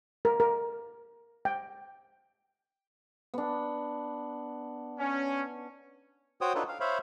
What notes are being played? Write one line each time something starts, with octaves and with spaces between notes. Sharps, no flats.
A#4
A#4
G5
B3 D4
C#4
F#4 C5 C#5 G5 D#6
D4 D#4 F4 A4 B4 C#5
F5
C5 C#5 E5 F5 B5